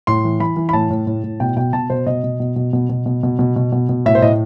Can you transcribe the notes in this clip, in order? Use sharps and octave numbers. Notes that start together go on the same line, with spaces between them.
A2 C6
E3
E3 B5
E3
B5
A2 A5
A2
A2
A2
B2 G5
B2 G5
B2 A5
B2 C5
B2 D#5
B2
B2
B2
B2
B2
B2
B2
B2
B2
B2
B2
A2 E5
C5
A2 D#5